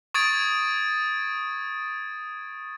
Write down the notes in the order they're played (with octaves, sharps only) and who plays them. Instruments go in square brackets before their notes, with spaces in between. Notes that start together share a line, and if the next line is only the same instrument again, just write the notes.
[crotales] C#6 D#6 G#6 A6 D7